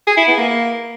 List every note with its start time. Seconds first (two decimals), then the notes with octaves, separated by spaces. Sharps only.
0.07 G#4
0.18 E4
0.28 B3
0.38 A#3